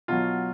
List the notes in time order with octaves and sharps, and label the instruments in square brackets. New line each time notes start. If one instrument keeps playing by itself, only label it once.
[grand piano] B2 F#3 F4